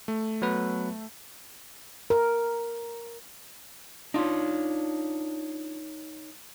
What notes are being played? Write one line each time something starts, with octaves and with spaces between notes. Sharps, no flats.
A3
F#3 B3 B4
A#4
D4 D#4 F4 C#5